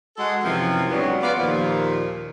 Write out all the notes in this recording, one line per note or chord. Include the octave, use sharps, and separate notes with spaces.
G#3 F#4 G#4 A4 D#5 F#5
F#2 C3 E3 F3
G#2 C#3 F#3 G3 B3
B3 F4 D5
D#2 A#2 F3